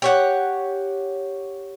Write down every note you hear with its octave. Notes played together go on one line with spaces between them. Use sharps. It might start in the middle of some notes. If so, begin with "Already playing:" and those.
G4 C#5 F#5